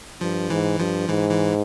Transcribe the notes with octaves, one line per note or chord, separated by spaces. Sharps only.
G2 F3
G#2 E3
G2 F3
G#2 E3
E3